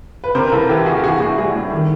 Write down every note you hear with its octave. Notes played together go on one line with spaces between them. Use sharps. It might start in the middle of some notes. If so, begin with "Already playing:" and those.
B4
C3 A#4 C5
A#4
C2 A4 B4
E3 G4 A4
C2 F#4 G#4
G4
E3 F#4 G#4
A2 F#4 G#4
G3 F#4 G#4
A2
D#3